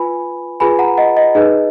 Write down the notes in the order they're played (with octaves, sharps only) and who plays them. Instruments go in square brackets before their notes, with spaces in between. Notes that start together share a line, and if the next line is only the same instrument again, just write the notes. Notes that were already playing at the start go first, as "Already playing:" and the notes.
Already playing: [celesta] F4 B4 G#5 B5
F4 G#4 B4 G#5 B5
F#5 A#5
D#5 F#5
D#5
D#4 G#4 B4 D#5